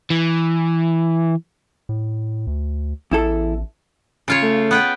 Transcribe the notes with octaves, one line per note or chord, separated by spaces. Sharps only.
E3
A2
D2
A1 E2 E4 A4
C#3 F4 C#5
A3
B3 B4 G5